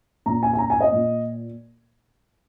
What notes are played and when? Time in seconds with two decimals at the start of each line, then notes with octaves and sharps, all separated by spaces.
0.26 A#2 A#5
0.43 G#5
0.53 G#5
0.58 A#5
0.70 G#5
0.81 D#5
0.92 A#2